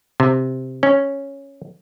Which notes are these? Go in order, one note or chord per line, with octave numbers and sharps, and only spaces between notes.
C3
C#4